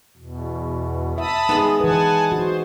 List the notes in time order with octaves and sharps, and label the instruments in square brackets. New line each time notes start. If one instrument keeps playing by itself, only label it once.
[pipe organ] E2 B2
[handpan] E5 [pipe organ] A5 B5 D#6
[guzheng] G#3 B3 [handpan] D#4
[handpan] E3 B4 [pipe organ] F#5 G#5 A5
[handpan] F#4 [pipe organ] C5